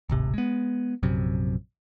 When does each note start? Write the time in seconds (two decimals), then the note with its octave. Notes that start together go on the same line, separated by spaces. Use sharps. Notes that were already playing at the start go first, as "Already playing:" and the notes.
0.09 D1 G#1 C3
0.34 G#3 B3
1.03 A#1 F#2 C3